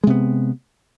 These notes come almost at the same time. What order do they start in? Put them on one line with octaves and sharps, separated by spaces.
G#3 C3 B3